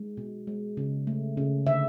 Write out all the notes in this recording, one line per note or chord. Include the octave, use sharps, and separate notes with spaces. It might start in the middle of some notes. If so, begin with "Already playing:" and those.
Already playing: G#3
B2
G#3
C#3
A3
C#3
D3 E5